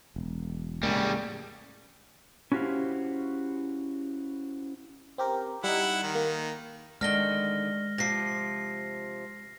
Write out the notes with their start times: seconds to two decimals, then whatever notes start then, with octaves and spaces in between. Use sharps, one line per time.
0.16 E1
0.83 A2 C#3 G3 G#3 A#3
2.52 C#4 E4 F#4 G4 C5 F5
5.18 C4 G4 A#4
5.64 G3 D#4 E4 F#5
6.03 D#3
6.15 A#3
7.01 D3 D#3 G#3 A3 F6 A#6 G7
7.98 C3 F3 A#6 C7